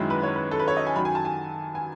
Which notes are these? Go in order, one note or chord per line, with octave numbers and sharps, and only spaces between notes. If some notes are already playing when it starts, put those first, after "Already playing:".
Already playing: F#2 D#3 G#3 C#4 E4
B4
C#5
B4
A4
B4
C#5
D#5
G#5
F#2 D#3 F#3 B5
G#5
A5
G#5
G#5